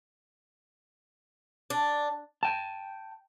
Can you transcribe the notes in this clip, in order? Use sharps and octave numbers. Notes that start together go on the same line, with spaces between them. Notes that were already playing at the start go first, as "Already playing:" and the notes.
D4
G5 A5